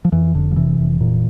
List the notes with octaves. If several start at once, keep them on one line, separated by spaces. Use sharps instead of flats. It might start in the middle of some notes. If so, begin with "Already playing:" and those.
F3
F2 E3
F1 D3
F3
C3 E3
F1
A#2